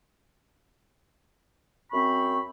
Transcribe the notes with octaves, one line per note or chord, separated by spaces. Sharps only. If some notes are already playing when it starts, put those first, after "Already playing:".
F#2 C4 B5 C#6